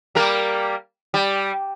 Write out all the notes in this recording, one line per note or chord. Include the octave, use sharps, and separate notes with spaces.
G3 A#3 A#4
G3